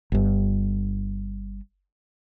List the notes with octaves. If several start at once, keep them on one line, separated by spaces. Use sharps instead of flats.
G1 G2